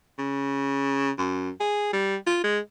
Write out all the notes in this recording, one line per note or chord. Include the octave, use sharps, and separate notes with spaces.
C#3
F#2
G#4
G3
F4
G#3